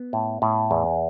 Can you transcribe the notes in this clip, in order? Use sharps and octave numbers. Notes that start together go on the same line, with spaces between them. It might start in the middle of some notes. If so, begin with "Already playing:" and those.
Already playing: B3
A2
A2
E2